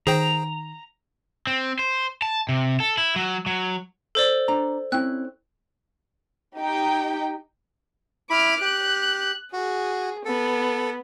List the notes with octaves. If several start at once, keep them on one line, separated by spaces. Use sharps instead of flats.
D#3 G#4 C5 G5 A#5
C4
C5
A5
C3
A4
E4
F#3
F#3
A4 C5 D5
D4 A#5
C4 C#4 E4 F#6
D#4 G4 G5
E4 B5 D6 F6
G4 F#6
F#4 G#4
B3 A4